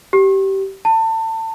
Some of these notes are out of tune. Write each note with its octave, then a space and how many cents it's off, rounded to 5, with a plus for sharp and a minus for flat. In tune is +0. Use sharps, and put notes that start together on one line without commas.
G4 -20
A5 +30